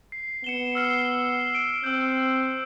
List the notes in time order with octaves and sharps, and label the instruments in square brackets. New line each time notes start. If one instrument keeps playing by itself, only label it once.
[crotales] C7
[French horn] B3 [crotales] C#7 E7 G7
[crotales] E6 F6 C7
D7
[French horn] C4 [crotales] E6 G6